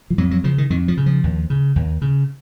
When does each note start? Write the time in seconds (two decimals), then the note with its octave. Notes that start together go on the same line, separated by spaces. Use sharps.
0.10 F3
0.18 F2 F#3
0.31 F#3
0.44 C#3 F3
0.58 D#3
0.70 F2 D#3
0.88 F3
0.97 C#3
1.06 F3
1.24 D#2
1.50 C#3
1.76 D#2
2.02 C#3